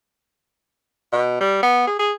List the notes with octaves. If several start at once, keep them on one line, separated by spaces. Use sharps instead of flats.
B2
G3
B3
G#4
G#4